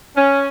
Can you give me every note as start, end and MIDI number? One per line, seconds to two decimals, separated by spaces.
0.16 0.48 61